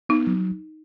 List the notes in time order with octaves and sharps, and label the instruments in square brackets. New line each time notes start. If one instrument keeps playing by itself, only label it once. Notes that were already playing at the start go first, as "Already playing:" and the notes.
[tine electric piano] B3 [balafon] D#4
[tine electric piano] F#3